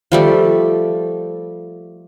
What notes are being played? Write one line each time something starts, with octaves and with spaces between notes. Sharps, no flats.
F3 G3 A3